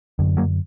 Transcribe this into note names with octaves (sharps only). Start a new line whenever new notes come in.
F#2 D3
F#3 A#3